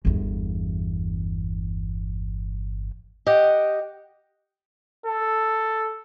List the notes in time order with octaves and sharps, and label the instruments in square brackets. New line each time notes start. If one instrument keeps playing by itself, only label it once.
[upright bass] G1 E2
[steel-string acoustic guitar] G4 D#5 F#5
[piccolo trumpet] A4